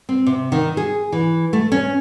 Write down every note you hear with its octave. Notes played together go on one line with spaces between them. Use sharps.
C4
C3
D#3
G#4
E3
A3
C#4